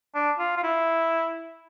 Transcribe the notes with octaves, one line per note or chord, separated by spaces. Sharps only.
D4
F4
F4
E4